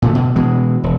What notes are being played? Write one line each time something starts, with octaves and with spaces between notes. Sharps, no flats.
A#2 D3 A3
B2
B2 E3 G#3
E1